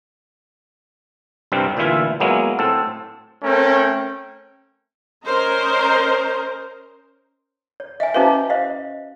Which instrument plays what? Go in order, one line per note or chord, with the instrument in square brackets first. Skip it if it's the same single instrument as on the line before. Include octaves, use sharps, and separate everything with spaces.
[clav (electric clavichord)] C2 G2 C3 G3 C4
D2 A#2 E3 E4 F4 E5
F#3 G#3 A#3 B3 C#4 E4
A2 C4 A4
[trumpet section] A3 C4 C#4 A#4 G5
[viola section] C#4 A#4 C5 D#5 A#5
[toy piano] C#5
[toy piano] D#5 G#5 [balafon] E5
[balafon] C#4 F#4 B4 [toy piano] E4 C5 F5
[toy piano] C5 D#5 F5